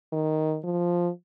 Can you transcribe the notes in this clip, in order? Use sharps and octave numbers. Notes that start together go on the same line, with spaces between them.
D#3
F3